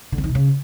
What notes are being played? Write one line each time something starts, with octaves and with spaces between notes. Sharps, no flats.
D3
C4
D#3
B2
C#3